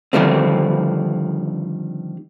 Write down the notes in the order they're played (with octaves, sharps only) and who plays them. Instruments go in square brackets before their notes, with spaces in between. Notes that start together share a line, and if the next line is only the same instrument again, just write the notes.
[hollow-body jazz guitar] D3 D#3 F3 G3 A3 C4